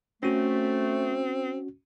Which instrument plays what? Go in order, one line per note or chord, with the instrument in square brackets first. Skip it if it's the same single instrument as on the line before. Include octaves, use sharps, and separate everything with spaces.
[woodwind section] A3 [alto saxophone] C4 [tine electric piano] C#4 F#4